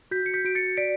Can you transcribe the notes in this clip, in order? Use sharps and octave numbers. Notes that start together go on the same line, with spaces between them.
F#4 G6 B6
C#7
G6 B6
F#4 D7
A6 C#7
D5 B6 D7